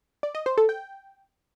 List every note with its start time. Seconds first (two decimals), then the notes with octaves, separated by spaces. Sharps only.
0.23 D5
0.35 D#5
0.46 C5
0.57 A4
0.69 G5